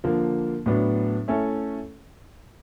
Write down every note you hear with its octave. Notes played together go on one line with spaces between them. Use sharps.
D3 F3 A#3
A2 F#3 B3 D4
A3 C#4 E4 A4